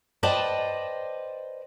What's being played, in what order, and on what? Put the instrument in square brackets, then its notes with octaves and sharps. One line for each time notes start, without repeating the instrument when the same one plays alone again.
[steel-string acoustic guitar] B4 C5 D5 D#5 G5 A5